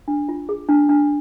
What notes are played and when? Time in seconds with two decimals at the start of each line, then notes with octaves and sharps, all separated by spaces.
0.08 D4
0.29 F4
0.49 G#4
0.69 D4
0.89 D4